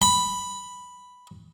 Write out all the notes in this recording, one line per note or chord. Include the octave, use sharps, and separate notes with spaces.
B5